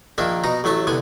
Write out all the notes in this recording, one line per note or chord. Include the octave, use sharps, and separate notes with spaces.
A#1 D#3 A#3 D4 E5
B2 D#4 A#5
A1 F#3 A3 E5 A5
C2 D3 B3 G#5